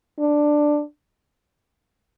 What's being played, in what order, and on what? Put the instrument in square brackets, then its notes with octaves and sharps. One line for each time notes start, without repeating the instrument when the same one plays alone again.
[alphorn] D4